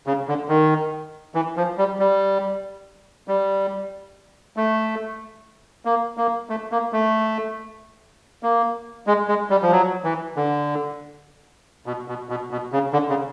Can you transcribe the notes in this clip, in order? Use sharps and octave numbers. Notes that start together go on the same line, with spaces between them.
C#3
D3
D#3
E3
F3
G3
G3
G3
A3
A#3
A#3
A3
A#3
A3
A#3
G#3
G#3
G3
F3
F#3
E3
D3
B2
B2
B2
B2
C#3
D3
C#3